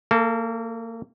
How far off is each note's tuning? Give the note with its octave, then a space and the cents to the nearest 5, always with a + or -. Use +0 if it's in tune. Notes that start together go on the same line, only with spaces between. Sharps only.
A#3 -30 A4 +0